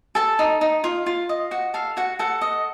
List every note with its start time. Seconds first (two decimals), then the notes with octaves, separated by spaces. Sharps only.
0.15 A4 A5
0.39 D#4
0.61 D#4
0.84 F4
1.06 F4
1.29 D#5
1.51 F#4 F#5
1.74 A4 F5
1.97 F#4 F#5
2.19 A4 F#5
2.41 D#5